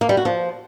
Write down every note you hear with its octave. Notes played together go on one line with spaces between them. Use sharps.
A#3
G3
F#4
F3